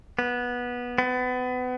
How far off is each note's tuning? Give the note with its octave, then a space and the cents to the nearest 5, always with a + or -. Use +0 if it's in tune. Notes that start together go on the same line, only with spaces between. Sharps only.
B3 -15
B3 +30